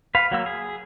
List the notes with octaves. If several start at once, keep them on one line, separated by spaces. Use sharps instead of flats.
B4 F5
F#3 A#3 E6
G#4